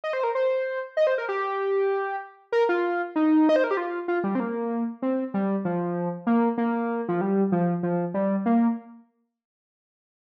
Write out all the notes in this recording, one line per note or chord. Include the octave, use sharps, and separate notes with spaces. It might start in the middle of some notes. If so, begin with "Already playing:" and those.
D#5
C5
A#4
C5
D#5
C5
A#4
G4
A#4
F4
D#4
D#5
C5
A#4
G4
F4
F4
G3
C4
A#3
C4
G3
F3
A#3
A#3
F3
G3
F3
F3
G3
A#3